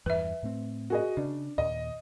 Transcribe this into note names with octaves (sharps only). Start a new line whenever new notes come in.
E2 G2 E3 B4 E5
A2 A3 C4
F#4 G#4 D#5
C#3 D4
D#2 A#2 D#5